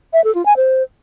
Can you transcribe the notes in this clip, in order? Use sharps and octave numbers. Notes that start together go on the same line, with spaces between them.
E5
A4
F4
G#5
C5